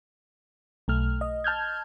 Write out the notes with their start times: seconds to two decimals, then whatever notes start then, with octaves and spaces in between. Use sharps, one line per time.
0.88 B1 A3 F6
1.21 D#5
1.44 A5 F6 G6 G#6